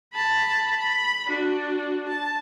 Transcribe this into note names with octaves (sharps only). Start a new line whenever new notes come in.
A5 B5
B5
D4 F#4
A5